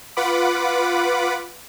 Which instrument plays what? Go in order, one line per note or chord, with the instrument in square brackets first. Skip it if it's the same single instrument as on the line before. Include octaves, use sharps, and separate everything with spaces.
[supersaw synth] F4 B4 F#5 B5 D6